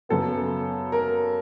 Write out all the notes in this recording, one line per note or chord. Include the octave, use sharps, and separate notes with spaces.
F#2 C#3 F#3 B3 A4
A#4